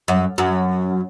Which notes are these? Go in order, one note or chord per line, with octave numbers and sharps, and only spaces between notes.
F#2
F#2